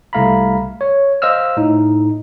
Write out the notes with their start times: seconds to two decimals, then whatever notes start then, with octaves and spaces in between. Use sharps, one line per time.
0.13 C2 A3 F5 A#5 B5
0.81 C#5
1.22 C5 D#5 F5 E6 F6
1.57 A2 D#4